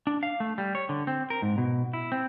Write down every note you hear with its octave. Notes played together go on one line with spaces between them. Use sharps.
D4
F5
A3
G3
C#5
D3
C4
A#4
G#2
B2
E4
C4